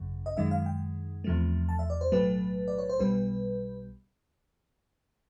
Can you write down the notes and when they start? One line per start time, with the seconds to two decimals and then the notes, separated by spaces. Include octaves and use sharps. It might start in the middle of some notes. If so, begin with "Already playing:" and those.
Already playing: G#1 F#2 C#3
0.26 D#5
0.37 F#2 D#3 G#3 E5
0.51 F5
0.66 G5
1.24 E2 C3 F3 A3
1.69 A5
1.79 E5
1.90 D5
2.01 C5
2.12 B1 A2 F#3 A3 B4
2.68 D5
2.78 C#5
2.89 C5
2.99 B1 B2 G3 B4